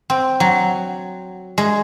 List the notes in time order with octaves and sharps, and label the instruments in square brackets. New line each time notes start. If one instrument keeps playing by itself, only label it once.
[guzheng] C4
F#3
G#3